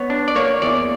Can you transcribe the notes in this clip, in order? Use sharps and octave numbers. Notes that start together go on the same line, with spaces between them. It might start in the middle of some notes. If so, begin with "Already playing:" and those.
Already playing: B3 C#5
D4
D5
A#3 C#5
E2 D5